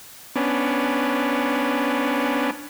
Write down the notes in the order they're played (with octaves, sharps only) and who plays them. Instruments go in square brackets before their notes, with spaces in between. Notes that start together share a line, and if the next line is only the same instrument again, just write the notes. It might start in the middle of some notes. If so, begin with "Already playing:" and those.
[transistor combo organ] B3 C#4 D4